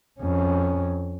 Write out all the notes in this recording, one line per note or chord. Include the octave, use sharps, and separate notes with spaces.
F2 C#4